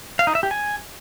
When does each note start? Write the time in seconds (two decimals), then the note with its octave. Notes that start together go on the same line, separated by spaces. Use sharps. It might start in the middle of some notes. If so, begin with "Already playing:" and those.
0.19 F5
0.27 D#4
0.35 E5
0.43 G4
0.51 G#5